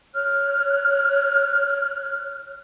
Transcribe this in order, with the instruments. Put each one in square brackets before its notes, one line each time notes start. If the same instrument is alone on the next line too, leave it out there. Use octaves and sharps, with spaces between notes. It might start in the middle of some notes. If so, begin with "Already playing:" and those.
[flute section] C#5 F6 F#6